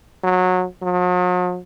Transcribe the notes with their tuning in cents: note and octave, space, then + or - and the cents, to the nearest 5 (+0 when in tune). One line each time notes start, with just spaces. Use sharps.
F#3 -20
F#3 -45